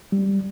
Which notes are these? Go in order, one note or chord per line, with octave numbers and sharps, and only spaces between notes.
G3